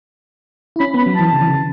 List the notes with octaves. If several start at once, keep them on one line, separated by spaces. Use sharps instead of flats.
E4
C#4 B5
B3 B5
F#3
E3 A5
C#3
E3
C#3